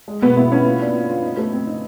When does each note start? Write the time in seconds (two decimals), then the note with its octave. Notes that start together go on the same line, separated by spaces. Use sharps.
0.08 G#3
0.22 B2 B3
0.37 B3 E4
0.51 C#4 E4
0.65 F4
0.80 D4
0.94 F4
1.09 F4
1.23 D#4
1.37 A3
1.53 C4
1.67 D#4